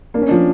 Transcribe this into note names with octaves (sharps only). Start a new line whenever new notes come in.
A#3 D4
C#4
F3 D4